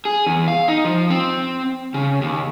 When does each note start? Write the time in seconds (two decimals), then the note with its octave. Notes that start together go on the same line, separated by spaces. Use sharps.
0.05 G#4
0.26 E2
0.48 F5
0.68 D#4
0.85 F3
1.10 C4
1.94 C#3
2.21 D#2